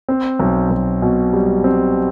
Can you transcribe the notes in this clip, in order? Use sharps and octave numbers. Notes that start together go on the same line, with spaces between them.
C4
B1
B1
B2
G3
C4